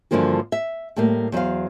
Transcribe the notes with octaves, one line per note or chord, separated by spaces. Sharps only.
G2 D3 E3 F3 A#3 F#4
E5
A2 G3 A3 A#3
E2 F#3 C5 F5